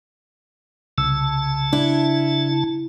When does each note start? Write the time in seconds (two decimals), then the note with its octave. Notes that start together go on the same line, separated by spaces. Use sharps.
0.98 C2 C#3 A5 E6
1.73 D4 E4